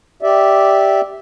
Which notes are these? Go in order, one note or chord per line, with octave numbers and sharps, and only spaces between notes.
G4 D5 E5